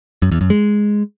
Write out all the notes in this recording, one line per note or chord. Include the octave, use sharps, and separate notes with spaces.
F#2
E2
F#2
G#3